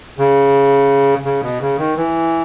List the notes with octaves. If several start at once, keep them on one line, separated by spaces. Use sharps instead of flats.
C#3
C#3
B2
C#3
D#3
E3